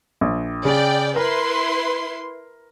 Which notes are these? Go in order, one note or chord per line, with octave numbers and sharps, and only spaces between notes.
A#1
C#3 D5 G5
E4 A#4 B4 C6